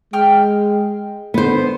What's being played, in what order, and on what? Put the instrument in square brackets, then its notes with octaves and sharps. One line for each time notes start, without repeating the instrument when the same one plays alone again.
[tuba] G#3 [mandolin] G5 F6
[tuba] D3 [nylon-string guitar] B3 C5